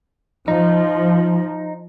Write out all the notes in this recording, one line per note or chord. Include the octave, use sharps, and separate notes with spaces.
F3 D#4